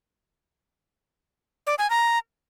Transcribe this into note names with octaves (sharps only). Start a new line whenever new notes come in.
D5
G#5
A#5